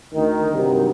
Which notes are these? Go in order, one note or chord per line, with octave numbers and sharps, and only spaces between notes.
D2 D#3
G2 C3 D#3 F#3 G3